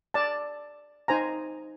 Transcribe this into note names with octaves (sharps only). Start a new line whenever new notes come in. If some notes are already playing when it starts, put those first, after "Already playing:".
D5 A5
D#4 C5 G#5 A#5